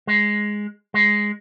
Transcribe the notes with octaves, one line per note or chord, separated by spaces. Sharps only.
G#3
G#3